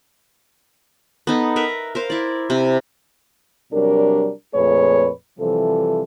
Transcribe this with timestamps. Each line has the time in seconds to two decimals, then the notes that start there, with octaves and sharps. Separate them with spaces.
1.27 B3 D#4 A4
1.56 A#4 B4 E5
1.95 A#4 C5 F5
2.10 E4 D5
2.50 C3
3.72 C3 F#3 G3 D4 A#4
4.54 F2 A#2 A3 G#4 B4 C#5
5.39 C3 E3 F3 G3 A4